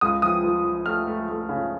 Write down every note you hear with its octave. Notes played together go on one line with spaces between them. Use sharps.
C#2 D#6
F3 D#6
F3
F3
A3 F6
A3
A3
C#3